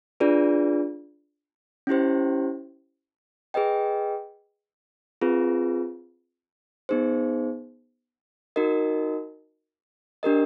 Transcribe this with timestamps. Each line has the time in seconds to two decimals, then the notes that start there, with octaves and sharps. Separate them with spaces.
0.20 D4 F4 G#4 B4 D5
1.87 C#4 E4 G4 C5
3.54 G#4 B4 D#5 G5
5.22 C4 F4 G#4 B4
6.89 B3 D#4 G#4 C5
8.56 D#4 F#4 A#4 D#5
10.23 D4 G4 A#4 D#5